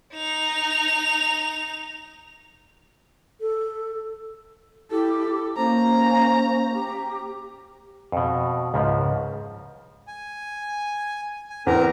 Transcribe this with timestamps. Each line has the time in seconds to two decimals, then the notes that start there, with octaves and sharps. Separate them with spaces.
0.13 D#4 F7
3.41 A4
4.91 E4 G4 A4
5.57 A#3 C#4 C5 A#5
6.73 G4
8.12 F2 B2
8.74 C#2 G#2 C#3 F3
10.08 G#5
11.50 G#5
11.67 E2 C4 A#4 A#5